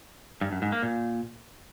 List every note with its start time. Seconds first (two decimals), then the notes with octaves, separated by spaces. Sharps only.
0.41 G2
0.52 F#2
0.62 G#2
0.72 A#3
0.83 A#2